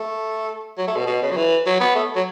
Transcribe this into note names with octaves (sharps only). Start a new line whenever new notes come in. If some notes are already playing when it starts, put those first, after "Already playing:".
Already playing: A3
F#3
A3
B2
B2
C#3
F#3
E3
F#3
B3
A3
F#3